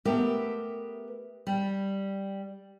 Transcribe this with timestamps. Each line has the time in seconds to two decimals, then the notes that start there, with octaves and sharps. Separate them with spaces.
0.05 A3 B3 G4 A#4 B4 E5
1.47 G3